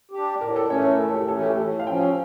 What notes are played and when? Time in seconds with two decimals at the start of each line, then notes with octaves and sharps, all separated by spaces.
0.11 D4 G4
0.41 A2 A#4
0.56 A4
0.70 E3 A3 C#4 C#5
0.85 A#4
0.99 A2 A4
1.09 A4
1.14 G4
1.28 E3 A3 C#4 A4
1.43 G4
1.57 A2 A4
1.80 F5
1.87 F3 C#4 G5